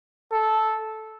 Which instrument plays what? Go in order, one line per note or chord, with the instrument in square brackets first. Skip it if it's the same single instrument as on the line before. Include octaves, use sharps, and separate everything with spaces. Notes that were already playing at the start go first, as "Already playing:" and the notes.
[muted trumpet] A4